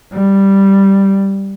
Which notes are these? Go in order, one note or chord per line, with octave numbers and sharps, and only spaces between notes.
G3